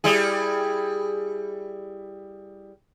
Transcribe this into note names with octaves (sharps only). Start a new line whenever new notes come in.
G3 E4 G#4